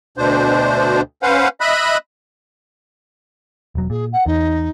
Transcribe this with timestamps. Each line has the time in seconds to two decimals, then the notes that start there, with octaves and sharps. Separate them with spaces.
0.18 D2 B2 D4 C5
1.23 C#4 B4 C5 F5 F#5
1.61 D#5 E5 B5 F#6
3.75 E1 F#3
3.90 A#2 G#4
4.12 F#5
4.26 E2 D#4